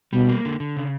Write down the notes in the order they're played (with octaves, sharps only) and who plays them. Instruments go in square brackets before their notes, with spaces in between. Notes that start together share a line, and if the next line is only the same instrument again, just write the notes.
[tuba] B2 [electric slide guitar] G3
[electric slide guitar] A#3
D3
D3
C#3